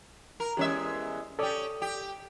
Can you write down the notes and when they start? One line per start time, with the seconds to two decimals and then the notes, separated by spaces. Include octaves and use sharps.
0.40 A#4
0.57 E2 G#3 C#4 G4 E5
1.39 C#4 G4 A4 D5 D#6
1.82 G4